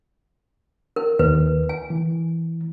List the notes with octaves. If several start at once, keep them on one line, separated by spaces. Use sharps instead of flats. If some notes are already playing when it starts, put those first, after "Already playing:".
A#4
D#2 B4
G#5
E3